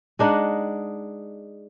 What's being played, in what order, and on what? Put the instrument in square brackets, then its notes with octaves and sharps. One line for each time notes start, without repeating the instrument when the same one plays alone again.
[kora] G#3 D4 D#4 F#5